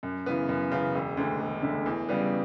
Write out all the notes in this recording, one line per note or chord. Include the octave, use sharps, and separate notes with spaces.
F#2
C#3 E3 B3
F#2
C#3 E3 B3
E1
D2 D3
E1
D2 D3
E2
C#3 G3 B3